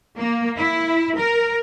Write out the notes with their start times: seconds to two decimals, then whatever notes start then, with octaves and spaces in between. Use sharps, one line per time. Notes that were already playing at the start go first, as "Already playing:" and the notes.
0.18 A#3
0.58 E4
1.18 A#4